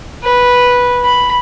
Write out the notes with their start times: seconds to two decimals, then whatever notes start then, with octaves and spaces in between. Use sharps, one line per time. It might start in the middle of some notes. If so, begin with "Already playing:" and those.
0.23 B4
1.04 B5